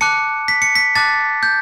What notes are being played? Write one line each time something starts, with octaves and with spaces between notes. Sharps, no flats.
A5 D6 F#6 C#7
B6
C#7
B6
A5 D6 F#6 A6
G6